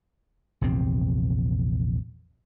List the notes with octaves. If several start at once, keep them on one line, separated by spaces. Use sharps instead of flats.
A#1 E2 C3 C4